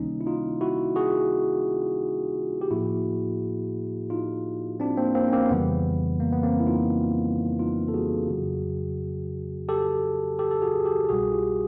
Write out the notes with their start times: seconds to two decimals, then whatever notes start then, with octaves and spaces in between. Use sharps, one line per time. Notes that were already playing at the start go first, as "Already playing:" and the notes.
Already playing: C#2 C3 D#3 G3 A#3 C#4 D#4
0.21 E4
0.26 D#4 F4
0.61 E4 F#4
0.96 F#4 G#4
2.61 G4
2.71 A2 F3 A#3 E4 F#4
4.10 D#4 F4
4.80 C4 D4
4.97 A#3 C4
5.15 A#3 C4
5.28 C#4
5.33 A#3 C4
5.50 F2 C#3 E3 G3 B3
6.20 A#3
6.33 B3
6.43 A#3 C4
6.60 E4
6.66 D#4 F4
7.59 D#4 F4
7.88 A4
7.94 F#4 G#4
8.29 F2 C#3 F#3
9.69 G4 A4
10.39 G4 A4
10.51 A4
10.62 F#4 G#4
10.80 G#4
10.85 G4 A4
11.04 A4
11.09 C2 B2 G3 F#4 G#4
11.32 F4 G4